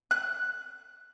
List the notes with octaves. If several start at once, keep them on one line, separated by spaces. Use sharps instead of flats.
F#6